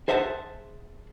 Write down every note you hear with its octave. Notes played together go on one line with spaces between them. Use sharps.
G#4 C5 E5 F#5 G#5 A5